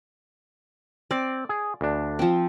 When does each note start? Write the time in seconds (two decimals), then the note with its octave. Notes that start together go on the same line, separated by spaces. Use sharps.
1.11 C4 D5
1.49 G#4
1.81 D2 D4
2.19 F3 C4